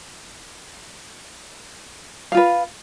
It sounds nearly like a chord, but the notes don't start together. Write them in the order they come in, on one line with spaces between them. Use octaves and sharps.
F5 F4 B4